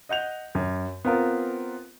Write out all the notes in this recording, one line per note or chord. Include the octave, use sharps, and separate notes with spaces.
D#5 F#5 G6 F7
F#2
B3 C4 F4 A#4